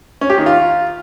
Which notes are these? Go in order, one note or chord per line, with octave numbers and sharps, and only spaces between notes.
C#4
G4
D#3
F4